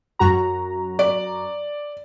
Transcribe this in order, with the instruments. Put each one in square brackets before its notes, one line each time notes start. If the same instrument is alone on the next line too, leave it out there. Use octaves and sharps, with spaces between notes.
[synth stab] F#2 F#4 A#5
[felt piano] D5